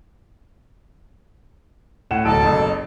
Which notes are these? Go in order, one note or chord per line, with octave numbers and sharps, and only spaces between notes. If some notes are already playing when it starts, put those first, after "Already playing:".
A2 F#5 E7
D1 B1 A4 A5 D7
F#1 B1